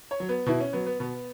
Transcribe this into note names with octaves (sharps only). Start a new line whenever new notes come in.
C#5
F#3
B3
B2 E4
C#4
F#3 B3
B3
B2 B3